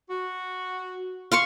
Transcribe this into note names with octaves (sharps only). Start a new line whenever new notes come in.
F#4
F5 C6 C#6